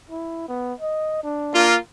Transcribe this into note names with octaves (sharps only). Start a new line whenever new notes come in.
E4
B3
D#5
D4
A#3 F4